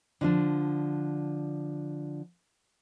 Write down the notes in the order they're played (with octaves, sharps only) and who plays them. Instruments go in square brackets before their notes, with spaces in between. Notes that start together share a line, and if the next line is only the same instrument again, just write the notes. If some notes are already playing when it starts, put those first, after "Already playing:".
[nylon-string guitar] D3 F3 D4